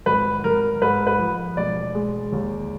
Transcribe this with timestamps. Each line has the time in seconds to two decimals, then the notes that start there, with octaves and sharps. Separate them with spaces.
0.06 G#1 B4
0.44 G#1 A#4
0.82 G#2 B4
1.07 B4
1.19 F3
1.57 E1 D5
1.95 G#3
2.32 D#2